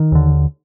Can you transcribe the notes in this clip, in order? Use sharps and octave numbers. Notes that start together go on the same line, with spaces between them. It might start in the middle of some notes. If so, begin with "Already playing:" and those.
Already playing: D#3
D#2 D3